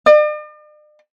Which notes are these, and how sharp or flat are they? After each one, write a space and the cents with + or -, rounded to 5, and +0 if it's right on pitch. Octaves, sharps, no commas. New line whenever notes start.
D5 +45